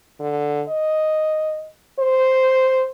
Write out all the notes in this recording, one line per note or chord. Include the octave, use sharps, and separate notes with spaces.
D3
D#5
C5